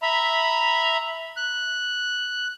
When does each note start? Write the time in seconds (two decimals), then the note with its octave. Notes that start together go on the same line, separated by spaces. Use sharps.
0.02 E5 A#5 B5
1.37 F#6